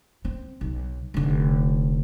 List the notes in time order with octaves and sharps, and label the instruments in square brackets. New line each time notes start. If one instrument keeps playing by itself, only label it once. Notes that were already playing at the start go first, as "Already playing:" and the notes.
[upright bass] C4
B1
F1 D3